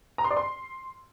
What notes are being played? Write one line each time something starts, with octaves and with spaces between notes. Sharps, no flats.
A#5
C6
D5
C6